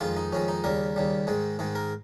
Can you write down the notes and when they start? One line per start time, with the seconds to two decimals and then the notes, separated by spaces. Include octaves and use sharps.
0.01 F2 D#3 G#3 F4
0.17 D#4
0.32 F2 D#3 G#3 C#4
0.48 D#4
0.64 D#2 C#3 G3 A#4
0.96 D#2 C#3 G3
1.27 G#2 D#3 G#3
1.59 G#2 D#3 G#3
1.75 A#4